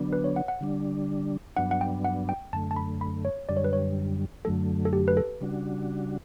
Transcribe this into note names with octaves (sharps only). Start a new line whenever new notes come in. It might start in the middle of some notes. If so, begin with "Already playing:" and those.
Already playing: D3 F#3 B3 D4
B4
C#5
F#5
F#5
D3 G3 D4
G2 F#3 B3 D4 F#5
F#5
G5
F#5
G5
F#2 D3 A3 A5
A5
B5
B5
C#5
F#2 D3 G3 D5
C#5
B4
C#5
F#2 D3 F#3 A3 A4
A4
G4
B4
A4
C#3 G3 D4 F#4